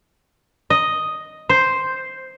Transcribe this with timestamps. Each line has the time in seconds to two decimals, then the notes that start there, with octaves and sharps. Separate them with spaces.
0.70 D#5
1.49 C5